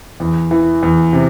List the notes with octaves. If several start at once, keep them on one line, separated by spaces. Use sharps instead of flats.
E2
E3
E2
C3